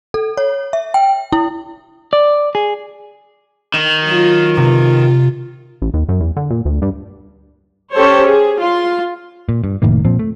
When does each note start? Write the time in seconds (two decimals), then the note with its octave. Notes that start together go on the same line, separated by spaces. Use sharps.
0.14 A4
0.37 C#5
0.73 E5
0.94 G5
1.32 E4
2.13 D5
2.55 G#4
3.74 D#3
4.04 F#3 F4
4.57 C3 F4
5.82 A1
5.94 D#2
6.09 F#2
6.21 E2
6.37 D3
6.51 A#2
6.65 D2
6.82 G2
7.94 C#4 G4 A4 C5 C#5
8.26 G#4
8.60 F4 C6
9.49 A#2
9.64 G2
9.82 F1 A2 D#3 A#3
10.05 A#2 F3 C4
10.19 A3